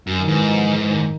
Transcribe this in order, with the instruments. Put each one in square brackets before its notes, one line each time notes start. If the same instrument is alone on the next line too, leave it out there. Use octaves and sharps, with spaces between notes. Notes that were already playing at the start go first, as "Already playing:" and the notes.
[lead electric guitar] F#2 [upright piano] F#3
[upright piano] D#3
[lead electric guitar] G#2 [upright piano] E3
[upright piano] F3
E3
D#3